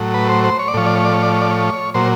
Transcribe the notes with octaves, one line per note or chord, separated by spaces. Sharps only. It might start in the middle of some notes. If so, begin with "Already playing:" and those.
Already playing: A2 F#3
B4
C5
C5
C#5
D5
A2 F3 C#5
D5
C#5
D5
C#5
D5
C#5
D5
C#5
A#2 F#3 C5